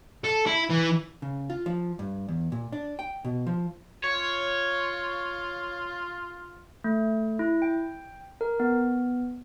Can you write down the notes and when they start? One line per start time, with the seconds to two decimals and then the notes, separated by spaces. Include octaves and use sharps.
0.24 A4
0.47 E4
0.70 E3
1.22 C#3
1.50 F4
1.66 F3
1.99 G2
2.28 E2
2.52 A#2
2.72 D4
2.99 G5
3.25 B2
3.47 F3
4.04 F4 C#5
6.84 A3
7.39 E4
7.62 G5
8.41 A#4
8.60 B3